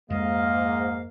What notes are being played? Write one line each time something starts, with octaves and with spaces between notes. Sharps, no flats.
F2 G#2 G#3 A#3 D#5 F5